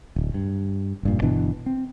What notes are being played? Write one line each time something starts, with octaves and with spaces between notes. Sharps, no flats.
D1
G2
F1 G2 A#2
G1 B2 E3 D4
C4